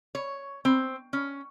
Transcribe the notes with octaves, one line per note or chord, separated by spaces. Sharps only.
C#5
C4
C#4